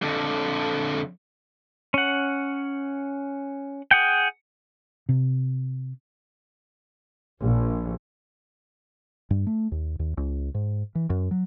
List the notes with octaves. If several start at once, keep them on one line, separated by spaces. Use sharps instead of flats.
F2 D3
C#4 F#5
G#4 F#5 G5
C3
A#1
G2
A3
D#2
D#2
C#2
G#2
E3
F#2
F#3